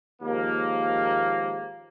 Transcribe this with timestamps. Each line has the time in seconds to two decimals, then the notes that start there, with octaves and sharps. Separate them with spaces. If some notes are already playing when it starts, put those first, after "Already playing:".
0.22 D#2 G#2 F3 G#3 A#3